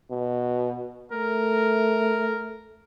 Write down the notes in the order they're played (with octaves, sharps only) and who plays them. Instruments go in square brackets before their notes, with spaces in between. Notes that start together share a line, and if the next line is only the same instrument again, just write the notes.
[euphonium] B2
[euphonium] A3 [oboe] A#4